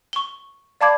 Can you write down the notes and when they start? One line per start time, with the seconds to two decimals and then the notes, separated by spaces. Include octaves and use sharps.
0.13 C#6 G7
0.81 D5 F5 A5 B5 D6 G#6